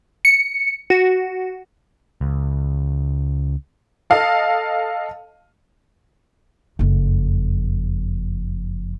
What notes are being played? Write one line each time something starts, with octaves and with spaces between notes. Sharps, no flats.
C#7
F#4
C#2
A4 D#5 F5 A5
F#1 F2